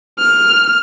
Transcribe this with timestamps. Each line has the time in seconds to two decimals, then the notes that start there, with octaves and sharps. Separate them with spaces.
0.19 F6